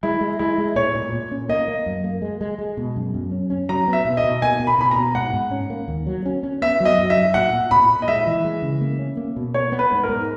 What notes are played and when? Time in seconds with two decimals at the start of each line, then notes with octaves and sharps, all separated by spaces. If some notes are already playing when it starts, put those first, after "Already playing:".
0.03 G#3 E4
0.21 G#3
0.39 G#3 E4
0.58 G#3
0.75 A#2 C#5
0.95 A#2
1.12 A#2
1.31 C#4
1.49 A#3 D#5
1.68 A#3
1.86 F#2
2.04 A#3
2.22 G#3
2.41 G#3
2.58 G#3
2.77 B2
2.96 F#2
3.14 F#2
3.32 C#4
3.50 C#4
3.69 F#3 A#5
3.88 B3
3.93 E5
4.05 B2
4.17 D#5
4.24 B2
4.42 A#3 G#5
4.60 B2
4.67 B5
4.78 B2 B5
4.91 B2 A#5
5.15 G#2 F#5
5.33 G#2
5.51 C#4
5.70 A#3
5.88 D#2
6.07 F#3
6.26 C#4
6.43 C#4
6.62 B3 E5
6.80 F#3
6.85 D#5
6.98 F#2
7.10 E5
7.16 F#3
7.34 A#2 F#5
7.53 A#2
7.71 A#2 B5
7.89 A#2
8.02 D#5
8.08 G#3 E5
8.27 E3
8.44 G#3
8.62 C#3
8.81 A#3
8.99 C#4
9.17 A#3
9.36 B2
9.54 B3 C#5
9.72 B3
9.79 B4
9.91 G#2
10.03 A#4
10.09 G#2